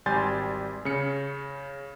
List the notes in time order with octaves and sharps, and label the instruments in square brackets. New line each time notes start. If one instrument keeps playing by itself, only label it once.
[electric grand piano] G#1 G3 G#5 C6 G6 A6
C#3 C#4 C#7